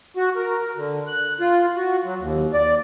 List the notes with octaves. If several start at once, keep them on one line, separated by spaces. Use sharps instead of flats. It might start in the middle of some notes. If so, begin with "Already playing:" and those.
F#4
A#4
D3
F#6
F4
F#4
F#3
D#2
D5